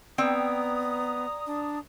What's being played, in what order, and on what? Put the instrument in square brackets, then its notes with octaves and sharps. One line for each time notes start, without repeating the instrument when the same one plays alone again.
[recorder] B3 [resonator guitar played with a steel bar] C4 G5 [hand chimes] D5 [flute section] A#5 D#6
[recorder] D4